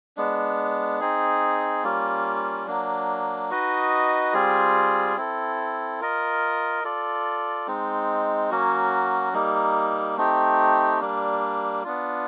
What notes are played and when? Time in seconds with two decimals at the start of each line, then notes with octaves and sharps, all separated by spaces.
0.17 G#3 B3 D4
1.00 C4 D#4 G#4
1.84 G3 A#3 C#4 F4
2.67 F#3 A#3 D4
3.50 D#4 F#4 B4 D#5
4.33 G3 C4 F4 G#4
5.17 C4 E4 A4
6.00 F4 A#4 D#5
6.84 F4 A4 D5
7.67 G#3 C4 D#4
8.51 F#3 A#3 C#4 F#4
9.34 G3 A#3 D#4
10.17 A3 C4 D#4 G4
11.01 G3 A#3 D4
11.84 B3 D4 F4